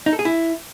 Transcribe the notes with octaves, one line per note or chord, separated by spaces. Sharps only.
D#4
A4
G#4
E4